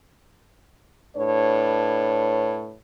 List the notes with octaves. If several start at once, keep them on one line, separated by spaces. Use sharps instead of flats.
A2 D4 B4 C#5